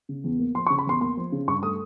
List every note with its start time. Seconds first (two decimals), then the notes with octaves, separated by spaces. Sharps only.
0.09 C#3
0.24 E2
0.39 A#3
0.55 F3 C6
0.67 C#6
0.70 C#3
0.79 B5
0.86 E2 C6
1.01 A#3 C6
1.17 F3
1.32 C#3
1.48 G2 C#6
1.63 A3 D#6